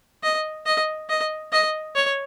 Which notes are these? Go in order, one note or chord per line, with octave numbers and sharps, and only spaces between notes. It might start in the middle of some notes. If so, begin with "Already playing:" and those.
D#5
D#5
D#5
D#5
C#5